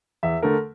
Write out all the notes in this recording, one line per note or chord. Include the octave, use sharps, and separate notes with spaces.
E2 E5
D3 A3 A#4